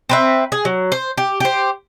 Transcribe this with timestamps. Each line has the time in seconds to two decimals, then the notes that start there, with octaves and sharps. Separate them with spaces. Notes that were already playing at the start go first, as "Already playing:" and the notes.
0.09 C4 B4 E5
0.52 G#4
0.65 F#3
0.92 C5
1.18 G4
1.40 G4 C5